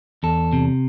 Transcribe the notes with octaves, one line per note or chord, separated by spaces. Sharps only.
E2 A4
C3